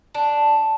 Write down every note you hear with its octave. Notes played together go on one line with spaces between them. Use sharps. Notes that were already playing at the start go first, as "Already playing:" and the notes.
D4